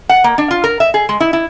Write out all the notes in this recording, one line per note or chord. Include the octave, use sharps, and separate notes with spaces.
F#5
A#3
D4
F4
A#4
E5
G#4
G#3
E4
E4